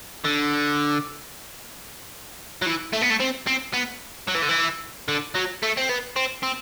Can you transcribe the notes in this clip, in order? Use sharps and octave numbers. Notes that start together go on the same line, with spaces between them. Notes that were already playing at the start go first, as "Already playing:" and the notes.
D3
F#3
E3
A3
B3
A3
C4
C4
B3
F#3
E3
D3
E3
D3
F#3
A3
C4
B3
C4
C4